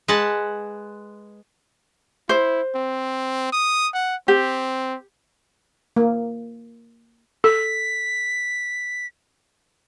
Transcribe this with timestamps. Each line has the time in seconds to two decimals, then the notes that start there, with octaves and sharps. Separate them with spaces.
0.08 G#3 B4 F#5 A5
2.29 E4 C5
2.75 C4
3.53 D#6
3.94 F#5
4.28 C4 G4
5.96 A#3
7.44 A4 B6